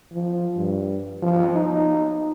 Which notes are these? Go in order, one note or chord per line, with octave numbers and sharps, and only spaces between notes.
F3
G2
F3
D#4